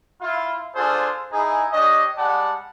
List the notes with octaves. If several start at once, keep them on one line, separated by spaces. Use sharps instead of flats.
E4 F4
D4 F4 G#4 A4 C5
D#4 E4 G#4
D4 G4 C#5 D#5
G3 G#3 D5 F#5 A5